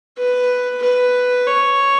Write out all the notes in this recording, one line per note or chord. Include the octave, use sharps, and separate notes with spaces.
B4
B4
C#5